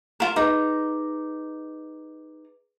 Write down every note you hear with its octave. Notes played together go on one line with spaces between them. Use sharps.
F4 A#4 E7
D#4 G#4 B4 A#5 D6